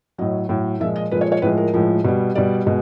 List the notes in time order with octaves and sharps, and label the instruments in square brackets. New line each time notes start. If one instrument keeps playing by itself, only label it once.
[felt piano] A2 F#3 D#5
A2 F#3
A#2 F3 G#3 E5
D#5
A#2 F3 G#3 B4
C#5
C#5
A2 F3 G#3 B4
A#4
A2 F3 G#3
B2 G3
B2 G3 D5
B2 G#3